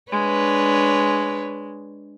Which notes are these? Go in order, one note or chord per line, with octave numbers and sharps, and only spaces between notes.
G#3 D4 B4 C#5